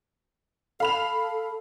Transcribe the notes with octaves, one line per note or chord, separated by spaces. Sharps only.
A4 F5 B5 F7